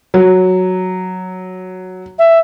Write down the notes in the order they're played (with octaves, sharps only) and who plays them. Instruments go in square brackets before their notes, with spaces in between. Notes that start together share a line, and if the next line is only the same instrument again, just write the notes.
[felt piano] F#3
[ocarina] E5